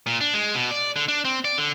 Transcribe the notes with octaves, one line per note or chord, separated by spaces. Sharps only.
A#2
D4
G#3
B2
D5
D3
D4
C4
D5
D3